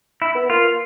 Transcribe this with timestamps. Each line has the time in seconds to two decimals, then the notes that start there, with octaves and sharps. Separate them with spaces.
0.22 E4
0.35 B3
0.50 A#3 F4